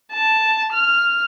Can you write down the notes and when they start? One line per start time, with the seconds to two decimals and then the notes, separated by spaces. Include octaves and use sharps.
0.12 A5
0.73 F6